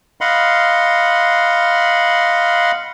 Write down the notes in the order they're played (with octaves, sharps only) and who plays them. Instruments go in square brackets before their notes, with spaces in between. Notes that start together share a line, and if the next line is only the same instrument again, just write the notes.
[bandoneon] D#5 F5 F#5 B5 C6